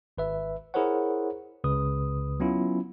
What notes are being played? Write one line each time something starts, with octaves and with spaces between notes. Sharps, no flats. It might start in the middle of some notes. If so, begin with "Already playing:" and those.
G#1 B4 E5
E4 G#4 A#4 C5 C#5 F#5
C#2 C#3 B4 D#6
F#3 B3 C#4 E4 F4